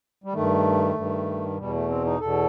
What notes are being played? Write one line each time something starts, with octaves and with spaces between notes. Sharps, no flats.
G3
G2 D#3 A3
G2 D#3
E2 B2 G3
A3
C4
D#4
E2 B2 A4